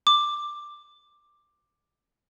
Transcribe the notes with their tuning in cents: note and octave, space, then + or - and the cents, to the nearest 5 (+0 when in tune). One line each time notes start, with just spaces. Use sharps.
D6 +10